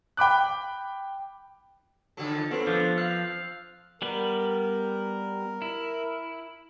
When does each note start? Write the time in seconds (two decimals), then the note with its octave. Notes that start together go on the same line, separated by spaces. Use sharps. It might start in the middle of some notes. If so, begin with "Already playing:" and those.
0.17 G5 B5 D6 F#6
2.17 D3 F#3 A4
2.31 F3
2.51 F#3 B3 C4 A4 B4
2.67 D3 F3
2.98 F5 E6 F#6
4.02 G3 B3 A#4 B4
5.62 E4